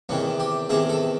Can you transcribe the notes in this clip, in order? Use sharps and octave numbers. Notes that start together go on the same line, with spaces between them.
E2 C3 D#3 C#4
G4
E2 C3 D#3 G#4
A4